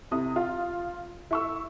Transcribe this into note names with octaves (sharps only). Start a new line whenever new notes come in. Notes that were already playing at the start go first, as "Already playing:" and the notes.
C3 E4 D#6
F4
E4 C#6 E6